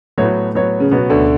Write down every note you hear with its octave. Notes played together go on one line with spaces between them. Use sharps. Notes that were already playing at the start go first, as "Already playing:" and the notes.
A2 F#3 A3 B3 F#4 C#5
F#3 B3 F#4 C#5
C#3
B2 F#3 B3 F#4 C#5
D2 D3